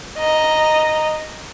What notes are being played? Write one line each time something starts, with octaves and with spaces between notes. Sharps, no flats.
D#5 A#5